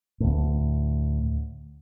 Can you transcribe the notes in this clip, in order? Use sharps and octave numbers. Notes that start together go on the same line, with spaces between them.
D2 A2